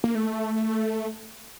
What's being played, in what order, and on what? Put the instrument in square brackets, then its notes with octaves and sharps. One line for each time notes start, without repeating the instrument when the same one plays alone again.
[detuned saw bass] A#3
A3